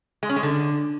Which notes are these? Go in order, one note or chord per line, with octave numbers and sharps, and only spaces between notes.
G#3
C#4
G#3
D3